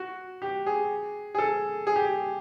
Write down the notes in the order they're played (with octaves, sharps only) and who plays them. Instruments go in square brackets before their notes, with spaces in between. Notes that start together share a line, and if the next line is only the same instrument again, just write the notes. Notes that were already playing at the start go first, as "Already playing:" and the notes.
Already playing: [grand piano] F#4
G4
G#4
G#4
A4
G#4
G4
G#4